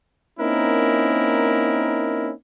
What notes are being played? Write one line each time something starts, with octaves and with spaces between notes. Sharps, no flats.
A#3 C4 C#4 D#4 E4 A#4